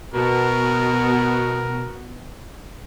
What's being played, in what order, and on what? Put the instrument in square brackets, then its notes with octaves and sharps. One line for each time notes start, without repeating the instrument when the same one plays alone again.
[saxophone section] B2 [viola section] B3 F#4 [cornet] A#4